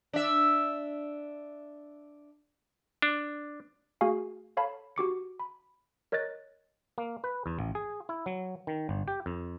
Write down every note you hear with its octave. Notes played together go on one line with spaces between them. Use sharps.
D4 E5
D4
A3 F#4 G#4 F5 G#5
A4 C#5 F5 A5 B5
F#4 G4 D6 C#7
B5
A#4 C#5 D#5 F#6 A6
A#3
B4
E2
A1
G#4
E4
F#3
D#3
G1
G4
F2